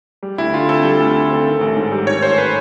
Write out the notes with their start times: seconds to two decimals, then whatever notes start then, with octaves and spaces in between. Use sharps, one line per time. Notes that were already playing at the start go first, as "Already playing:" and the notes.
0.23 G3
0.38 D2 E4
0.54 D3 F4
0.68 C4 A4
0.84 G3
1.00 D2
1.15 D3
1.31 C4
1.46 D#3
1.61 A1
1.77 G#2
1.91 G3
2.07 D#3 C#5
2.22 A1 C5
2.38 B4